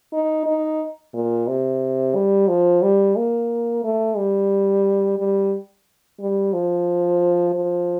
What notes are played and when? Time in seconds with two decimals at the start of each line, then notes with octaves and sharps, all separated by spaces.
0.13 D#4
0.46 D#4
1.14 A#2
1.48 C3
2.15 G3
2.48 F3
2.82 G3
3.16 A#3
3.84 A3
4.17 G3
5.19 G3
6.20 G3
6.53 F3
7.54 F3